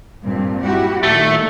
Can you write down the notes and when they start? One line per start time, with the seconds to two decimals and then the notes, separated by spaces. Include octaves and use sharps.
0.24 G2 A#2 C4
0.63 E4 F#4 G4
1.03 A#2 D#3 A3